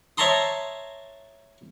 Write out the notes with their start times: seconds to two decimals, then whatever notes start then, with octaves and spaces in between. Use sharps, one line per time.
0.18 C#5 E5 A5 A#5 C6 D#6